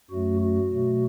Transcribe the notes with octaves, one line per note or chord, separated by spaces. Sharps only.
F#2 F#3 A3 F#4
F#4
B2 F#3 A3